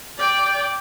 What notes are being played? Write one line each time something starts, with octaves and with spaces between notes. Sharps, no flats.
D5 G5